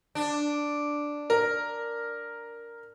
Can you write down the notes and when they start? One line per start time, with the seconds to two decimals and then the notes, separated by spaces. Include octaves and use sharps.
0.15 D4
1.30 A#4